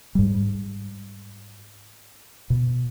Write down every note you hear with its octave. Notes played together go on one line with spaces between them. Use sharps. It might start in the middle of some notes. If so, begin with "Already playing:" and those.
G#2 G3
B2